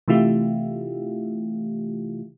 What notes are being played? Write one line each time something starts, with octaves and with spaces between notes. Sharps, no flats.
C3 E3 A3 E4 F4 G4